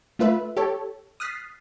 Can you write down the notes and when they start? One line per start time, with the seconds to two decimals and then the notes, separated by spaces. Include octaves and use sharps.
0.19 A3 F4 B4 E5
0.57 G4 A4 C#5
1.20 D#6 F6 F#6 A6 B6 C7